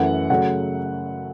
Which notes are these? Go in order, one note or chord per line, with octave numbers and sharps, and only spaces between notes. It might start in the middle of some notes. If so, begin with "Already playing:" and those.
Already playing: F#2 E3 A3 F#5
C#3 F#3 A3 F#5